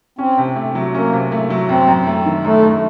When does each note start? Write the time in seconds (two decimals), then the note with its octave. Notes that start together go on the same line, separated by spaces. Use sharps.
0.19 C4 C#4
0.38 C3
0.56 A3
0.75 F#3
0.94 A#3 C#4
1.13 C3
1.32 A3
1.50 F#3
1.69 F#2 C4
1.88 F#2
2.07 A3
2.26 D#3
2.45 F#2 A3
2.63 F#2